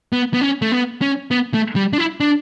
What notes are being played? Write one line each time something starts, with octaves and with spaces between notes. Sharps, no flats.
B3
B3
C#4
A3
B3
C#4
B3
A3
G3
D4
E4
D4